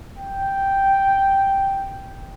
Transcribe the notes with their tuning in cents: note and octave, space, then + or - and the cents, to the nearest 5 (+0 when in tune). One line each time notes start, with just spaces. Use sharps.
G5 -5